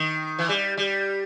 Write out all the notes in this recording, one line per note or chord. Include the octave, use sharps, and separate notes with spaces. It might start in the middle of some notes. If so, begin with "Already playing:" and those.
Already playing: D#3
E3
G3
G3